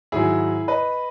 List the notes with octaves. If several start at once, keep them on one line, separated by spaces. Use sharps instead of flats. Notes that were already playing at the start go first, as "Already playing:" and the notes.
G#2 D#3 F#3 E4 G#4
B4 D#5